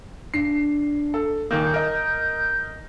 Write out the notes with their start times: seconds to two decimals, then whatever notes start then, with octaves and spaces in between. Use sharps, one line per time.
0.34 D4 C7
1.14 A4
1.51 D#1 D#3 A#3 G6
1.74 A#4 D#5